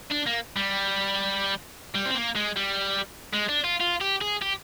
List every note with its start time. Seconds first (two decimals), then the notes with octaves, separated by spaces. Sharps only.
0.11 D4
0.26 A#3
0.56 G3
1.95 G3
2.06 C4
2.16 A#3
2.36 G#3
2.57 G3
3.34 G#3
3.49 D4
3.64 F4
3.80 F4
4.01 G4
4.21 G#4
4.42 G4